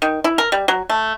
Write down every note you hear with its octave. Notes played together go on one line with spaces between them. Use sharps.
D#3
E4
A#4
G3
F#3
A3